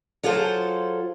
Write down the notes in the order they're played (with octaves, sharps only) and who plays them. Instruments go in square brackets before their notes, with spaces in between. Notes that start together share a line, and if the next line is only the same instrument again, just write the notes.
[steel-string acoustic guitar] F#3 F4 G#4 A4 C5